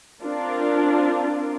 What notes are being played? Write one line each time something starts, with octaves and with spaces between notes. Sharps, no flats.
C4 D4 F4 A#4